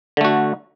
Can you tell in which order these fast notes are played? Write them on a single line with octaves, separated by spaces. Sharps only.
D3 A3 F#4